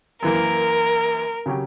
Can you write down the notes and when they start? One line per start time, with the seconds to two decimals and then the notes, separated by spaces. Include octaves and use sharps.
0.23 F#2 E3 A#3 A#4
1.46 C#3 F#3 C#4 G4